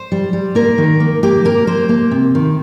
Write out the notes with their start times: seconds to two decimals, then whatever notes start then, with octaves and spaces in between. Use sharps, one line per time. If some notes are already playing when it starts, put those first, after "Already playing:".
Already playing: C5
0.12 G3
0.33 G3
0.55 A#3 A#4
0.78 D#3
1.00 A#3
1.23 A#3 G4
1.45 A#3 A#4
1.67 A#3 C5
1.89 A#3
2.11 C3
2.35 D#3